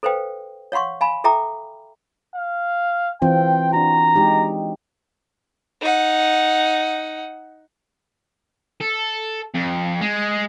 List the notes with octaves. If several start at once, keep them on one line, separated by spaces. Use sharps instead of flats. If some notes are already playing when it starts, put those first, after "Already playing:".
A4 B4 C5 F5 G5
C#5 F5 F#5 C6 C#6
F5 G#5 B5
A4 E5 G5 A#5 D6
F5
E3 C4 F4 G5
D4 F#4 A#5
G#3 D#4 G4
D#4 F#5
A4
F2
G#3